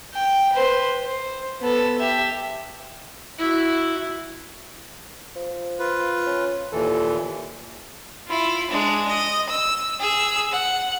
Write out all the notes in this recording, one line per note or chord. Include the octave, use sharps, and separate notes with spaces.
G5
B4 C5
C5
B3 A4
G4 E5
E4 F#4
F3
F4 B4
C#4
D#2 A#2 E3 A4
E4 F4
G#3 D4
D#5
E6
G#4 E6
F#5